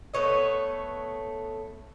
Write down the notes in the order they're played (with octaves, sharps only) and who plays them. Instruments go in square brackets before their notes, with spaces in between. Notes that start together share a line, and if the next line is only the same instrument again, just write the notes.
[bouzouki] A3 B3 C#5 D#5